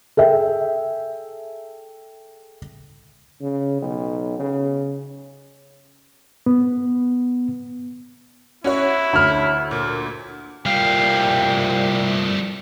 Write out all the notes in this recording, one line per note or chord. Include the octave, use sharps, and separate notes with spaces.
G#4 A4 E5 G5
C#3
B1
C#3
B3
C#4 E4 F#4 C#5
D2 F6
A#2
C2 A#2 G3 A3 F5 G5